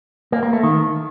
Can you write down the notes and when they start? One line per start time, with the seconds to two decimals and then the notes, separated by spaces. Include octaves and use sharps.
0.32 A#3
0.43 A#3
0.53 A3
0.63 D#3